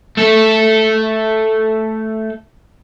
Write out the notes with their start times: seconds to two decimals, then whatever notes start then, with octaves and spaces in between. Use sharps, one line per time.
0.18 A3 A4